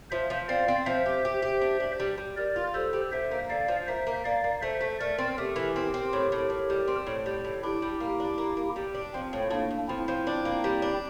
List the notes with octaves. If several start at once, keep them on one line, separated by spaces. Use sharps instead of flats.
F3 C5 E5
F3
C4 D5 F5
C4
F3 C5 E5
G4
G4
G4
D4
D4
G3
G3
G3 A#4 D5
F4
G3 A4 C5
G3
D3 C5 E5
A#3
D3 D5 F5
F3
A#3 C5 E5
A#3
A#3 D5 F5
A#3
A3 C5 E5
A3
A3 A#4 D5
C4
A3 G4 A#4
E3
C4
C4
A2
A2
A2
G3
C4
A2
G3
A2
D4 E4 G4
G3
A#3
D4
A#3
A#3
G3
D4
F3 C4
A2
A2 A#3 D4
A2
F3 C4 E4
F3
D4
A#3
G3
D4